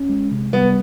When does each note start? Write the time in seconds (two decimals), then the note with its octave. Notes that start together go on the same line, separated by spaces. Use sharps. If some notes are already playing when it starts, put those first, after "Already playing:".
Already playing: C#4
0.09 G#3
0.31 C3
0.53 G3 B3